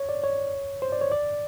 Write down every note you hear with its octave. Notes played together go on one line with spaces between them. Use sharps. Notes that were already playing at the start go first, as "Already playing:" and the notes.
Already playing: C#5
D5
C#5
C5
D5
C#5
D5